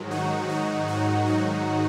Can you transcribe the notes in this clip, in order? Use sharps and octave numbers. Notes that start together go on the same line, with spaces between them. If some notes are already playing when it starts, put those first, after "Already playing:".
Already playing: G#2 D#3 F#3
D#4 F#4
D#4 F#4
D#4 F#4
D#4 F#4